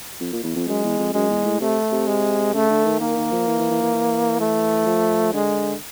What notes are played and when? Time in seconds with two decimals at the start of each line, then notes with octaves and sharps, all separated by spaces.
0.20 F2
0.33 A#2
0.43 E2
0.56 F2
0.67 F#2 G#3
0.83 E2
0.99 F2
1.14 F#2 G#3
1.30 E2
1.45 A2
1.61 C3 A3
1.92 C3
2.07 G#3
2.54 C#3 A3
2.69 D3
2.85 D#3
3.00 D#3 A#3
3.16 D#3
3.32 F3
3.47 E3
3.59 E3
3.71 E3
3.82 E3
3.94 E3
4.41 A3
4.86 F3
5.33 D3 G#3